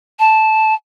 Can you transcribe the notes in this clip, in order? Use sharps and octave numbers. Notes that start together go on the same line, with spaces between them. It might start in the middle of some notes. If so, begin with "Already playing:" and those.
A5